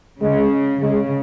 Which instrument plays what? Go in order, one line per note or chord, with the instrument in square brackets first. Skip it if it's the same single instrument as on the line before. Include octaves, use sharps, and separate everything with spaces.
[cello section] C#3 [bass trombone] G#3
[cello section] C#3 [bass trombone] G#3